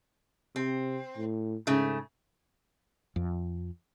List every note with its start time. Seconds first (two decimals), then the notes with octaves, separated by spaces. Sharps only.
0.56 C3 C4
1.17 A2
1.67 G#2 C#3 A3
3.16 F2